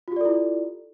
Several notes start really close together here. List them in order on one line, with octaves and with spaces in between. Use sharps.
F4 G4 D5 A4 E4